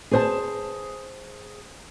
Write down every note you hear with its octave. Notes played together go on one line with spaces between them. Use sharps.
G#4 C5 A5